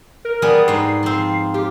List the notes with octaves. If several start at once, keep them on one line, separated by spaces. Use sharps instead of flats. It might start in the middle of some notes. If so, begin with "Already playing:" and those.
A#4
G3 B3 G#4
G#2 D#5 C7
F3 C4
F4 G4